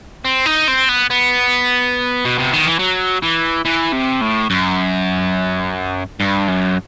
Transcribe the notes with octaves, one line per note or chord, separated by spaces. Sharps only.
C4
D#4
C4
B3
B3
B2
C3
D#3
E3
F#3
E3
E3
C3
A2
F#2
G2
F#2